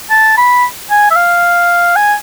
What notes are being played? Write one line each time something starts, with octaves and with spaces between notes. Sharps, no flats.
A5
B5
G#5
E5
F5
G#5